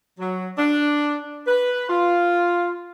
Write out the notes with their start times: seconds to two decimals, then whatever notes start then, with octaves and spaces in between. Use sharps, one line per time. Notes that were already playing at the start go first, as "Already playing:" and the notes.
0.20 F#3
0.58 D4
1.48 B4
1.90 F4